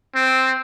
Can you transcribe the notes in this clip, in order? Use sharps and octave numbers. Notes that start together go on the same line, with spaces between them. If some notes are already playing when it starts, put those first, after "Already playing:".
C4